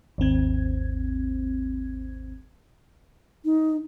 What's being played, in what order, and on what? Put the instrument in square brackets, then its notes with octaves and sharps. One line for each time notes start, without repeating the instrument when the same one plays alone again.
[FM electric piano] G#1 D#2 C4 G#6
[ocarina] D#4